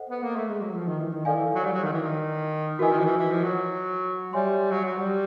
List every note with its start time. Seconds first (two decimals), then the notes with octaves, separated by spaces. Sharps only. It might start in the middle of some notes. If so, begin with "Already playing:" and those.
Already playing: A4 C5 D#5 F#5
0.09 B3
0.23 A#3
0.36 A3
0.48 G#3
0.61 F#3
0.74 F3
0.87 D#3
1.00 E3
1.12 D#3
1.25 D#3 A4 D5 F5 G#5
1.35 E3
1.54 F#3
1.64 G3
1.73 F#3
1.84 D#3
1.93 E3
2.03 D#3
2.79 E3 F#4 A#4 D#5 G#5
2.92 D#3
2.99 F3
3.05 E3
3.18 E3
3.31 F3
3.44 F#3
4.33 G3 C#5 E5 G#5 C6
4.71 F#3
4.85 F#3
4.97 G3